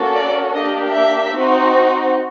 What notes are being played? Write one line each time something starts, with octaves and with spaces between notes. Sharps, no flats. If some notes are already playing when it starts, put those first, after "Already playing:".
Already playing: A#3 C#4 F#4 A4
D5
A#3 D4 G4 D#5
E5
C4 D#4 F#4